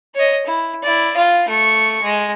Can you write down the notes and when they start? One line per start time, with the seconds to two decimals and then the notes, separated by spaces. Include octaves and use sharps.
0.15 C#5 D#5
0.46 E4
0.83 E4 D5
1.17 F4 F5
1.48 A3 C#6
2.02 G#3